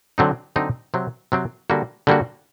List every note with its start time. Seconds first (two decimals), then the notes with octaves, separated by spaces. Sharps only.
0.18 D3 F#3 C4 D#4
0.56 D3 F#3 C4 D#4
0.94 C3 F#3 C4
1.32 C3 F#3 C4
1.70 D3 G3 A#3 F#4
2.07 D3 G3 A#3 F#4